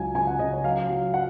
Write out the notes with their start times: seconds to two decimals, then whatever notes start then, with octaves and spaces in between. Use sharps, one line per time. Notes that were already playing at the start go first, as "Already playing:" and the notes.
Already playing: C#2 F#3 G#5
0.15 C#3 G#5
0.27 F#5
0.39 C#3 D#5
0.52 C#5
0.64 F#3 F5
0.89 F#3
1.14 F#5